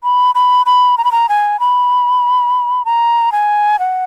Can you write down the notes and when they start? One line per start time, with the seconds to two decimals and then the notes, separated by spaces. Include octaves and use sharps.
0.04 B5
0.35 B5
0.66 B5
0.98 A#5
1.04 B5
1.12 A#5
1.29 G#5
1.60 B5
2.85 A#5
3.32 G#5
3.79 F#5